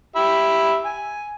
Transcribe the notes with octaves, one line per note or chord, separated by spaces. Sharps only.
G4 E5 B5
G#5